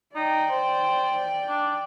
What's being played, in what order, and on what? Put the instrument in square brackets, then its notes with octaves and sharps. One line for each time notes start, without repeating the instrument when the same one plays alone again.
[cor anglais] D#4 [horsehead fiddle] D5 G5
[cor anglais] C5
D4